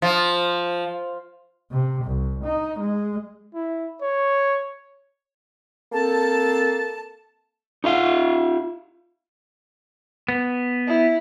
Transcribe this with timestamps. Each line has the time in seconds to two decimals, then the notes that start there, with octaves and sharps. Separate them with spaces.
0.02 F3
1.71 C3
2.05 C2
2.44 D#4
2.79 G#3
3.54 E4
4.02 C#5
5.92 A#3 C4 A4 A5
7.84 D#4 F4 F5
10.28 B3
10.87 E4